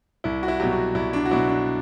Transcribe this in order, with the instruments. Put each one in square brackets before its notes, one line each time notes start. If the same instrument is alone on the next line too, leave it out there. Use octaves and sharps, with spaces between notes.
[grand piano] C2 E4
F#4
E4
B2 F#3 G4
F#4
C2 E4
D4
F#4
B2 F#3 E4
D4